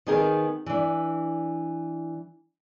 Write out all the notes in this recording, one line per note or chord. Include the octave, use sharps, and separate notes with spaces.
D#3 B3 D#4 G#4 A#4
E3 D4